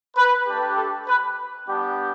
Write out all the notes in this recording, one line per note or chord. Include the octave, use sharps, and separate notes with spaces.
B4
A3 D4 G4
A4
B4
G3 B3 D4 G4